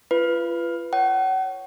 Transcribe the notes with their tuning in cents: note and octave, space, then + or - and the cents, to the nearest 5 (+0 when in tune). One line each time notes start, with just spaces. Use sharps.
F4 -35 B4 +5
C#5 +0 F#5 +35